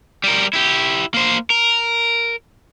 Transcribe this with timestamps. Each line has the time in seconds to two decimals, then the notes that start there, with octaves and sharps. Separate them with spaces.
0.24 G3 A#4
0.53 E4 G4
1.14 A#3 C5
1.50 A#4